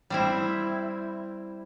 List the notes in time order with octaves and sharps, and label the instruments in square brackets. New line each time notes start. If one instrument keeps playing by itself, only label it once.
[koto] G3 C4 E4